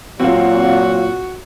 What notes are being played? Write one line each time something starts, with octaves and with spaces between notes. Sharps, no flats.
A#2 F#3 C4 F4 F#4